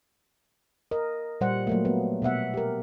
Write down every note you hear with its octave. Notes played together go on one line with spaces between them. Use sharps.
A#4 D#5
A#2 G3 C5 F#5
F#3 A3 A#3
B3
B2 B3 E5 F#5
G4 A#4